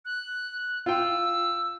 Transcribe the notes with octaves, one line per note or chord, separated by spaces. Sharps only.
F#6
F4 G5 E6